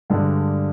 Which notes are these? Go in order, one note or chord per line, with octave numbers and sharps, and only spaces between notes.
G2 D3 G#3